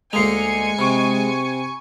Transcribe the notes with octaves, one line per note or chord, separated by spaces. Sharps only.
D2 G#3 A#3 D#4 G#5 C7 C#7 F7
C3 B5 C#6